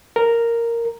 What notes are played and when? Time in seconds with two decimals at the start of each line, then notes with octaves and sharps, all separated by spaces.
0.16 A#4